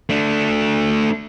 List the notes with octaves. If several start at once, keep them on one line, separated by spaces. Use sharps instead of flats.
A3 D4